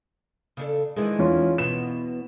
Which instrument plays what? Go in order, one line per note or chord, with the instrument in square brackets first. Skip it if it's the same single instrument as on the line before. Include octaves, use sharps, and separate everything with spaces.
[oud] C#3 D4 A4
[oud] D#3 E3 D4 [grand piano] G#3
[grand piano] E2 C#4 F4
[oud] E2 B2 B3 [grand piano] E7